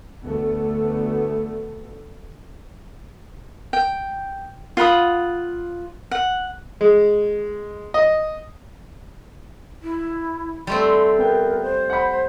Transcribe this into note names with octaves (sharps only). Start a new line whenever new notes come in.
D2 A3 B3
G5
F4 F#5 B5 D#6
F#5
G#3
D#5
E4
G3 A3 C4 C6
B3 A#4 G5
C5
F#5 B5